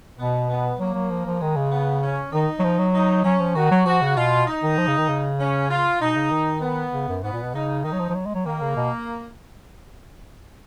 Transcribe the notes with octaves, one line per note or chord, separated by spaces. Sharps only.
B2 B3
B3
F#3 A#3
F#3
F3
F3
D#3 G#3
C#3
B3
C#4
D#3 D#4
F#3
F3
F#3
D#4
F#3 C#4
F3
D#3 F#4
F#3
F3 F#4
C#3
B2 F4
D#4
D#3
F3
C#3
D#3
C#3
C#4
F4
B2 D#4
C#3
D#3
B3
C#3
F#2
G#2 B3
A#2
B2
C#3 D#4
D#3 D#4
F#3
F3
F3
F#3
G#3
F#3
D#3 A#3
C#3
B2